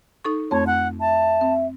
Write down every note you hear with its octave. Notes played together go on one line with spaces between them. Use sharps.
D#4 A4 C#6
F2 A3 C4 C#5
F#5
E5 A5
C4